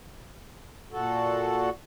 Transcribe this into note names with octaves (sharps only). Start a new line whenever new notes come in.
A#2 F#4 A4